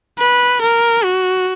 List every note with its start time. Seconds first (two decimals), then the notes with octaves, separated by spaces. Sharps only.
0.19 B4
0.62 A#4
1.04 F#4